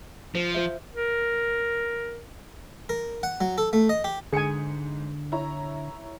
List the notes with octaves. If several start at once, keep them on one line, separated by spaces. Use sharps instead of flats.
F3 C5
F4 C5 E5
A#4
A#4
F#5
F#3
A4
A3
D#5
G4
G#2 D3 G#4 G#5 C#7
E4 C#5 A#5